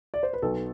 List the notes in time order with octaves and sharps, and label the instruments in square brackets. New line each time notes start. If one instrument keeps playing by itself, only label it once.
[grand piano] D5
C5
B4
B1 B2 A4